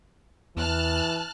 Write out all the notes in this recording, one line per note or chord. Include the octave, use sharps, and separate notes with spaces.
E2 E3 A5 F6 F#6